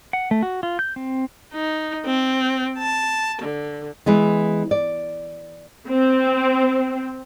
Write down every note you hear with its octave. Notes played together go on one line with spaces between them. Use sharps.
F#5
A3
F#4
F4
G6
C4
D#4
C4
A5
D3
E3 G#3 B3
D5
C4